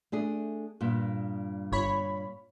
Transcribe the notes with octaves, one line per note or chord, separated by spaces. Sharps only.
A3 D4 G#4
G2 A#2
G1 C#5 B5